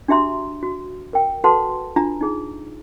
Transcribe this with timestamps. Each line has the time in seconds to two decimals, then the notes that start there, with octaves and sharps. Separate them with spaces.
0.08 D4 F#4 G4 E5 A#5 C6
0.63 F#4
1.13 A#4 G5
1.44 F#4 A4 B4 F#5 A5 C6
1.96 D4 F4 A#5
2.21 D#4 G#4